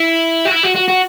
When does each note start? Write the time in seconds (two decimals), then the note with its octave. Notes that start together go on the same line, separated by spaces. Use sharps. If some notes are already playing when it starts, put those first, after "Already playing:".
Already playing: E4
0.46 F#4
0.52 E4
0.64 F#4
0.76 F#4
0.88 F#4